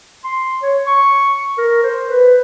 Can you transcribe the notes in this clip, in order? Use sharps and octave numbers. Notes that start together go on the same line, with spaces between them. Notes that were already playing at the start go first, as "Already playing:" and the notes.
C6
C#5
C#6
A#4
C5
B4